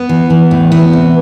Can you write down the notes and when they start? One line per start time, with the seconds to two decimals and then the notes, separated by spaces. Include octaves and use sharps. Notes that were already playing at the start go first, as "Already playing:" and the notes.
Already playing: B3
0.09 E3
0.30 E3
0.51 A2
0.72 E3 B3
0.93 C3